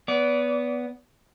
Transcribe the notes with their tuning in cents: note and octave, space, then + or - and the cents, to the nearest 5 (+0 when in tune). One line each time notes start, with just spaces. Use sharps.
B3 +0 D5 -35